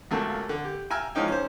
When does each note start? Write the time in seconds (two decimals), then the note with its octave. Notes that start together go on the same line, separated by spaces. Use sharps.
0.11 C#2 F#2 A3 A#3 A5
0.49 D3
0.65 G4
0.90 G5 G#5 A#5 E6 F6
1.15 E2 G#2 F3 C#4 D#4 G5
1.28 C#4 C5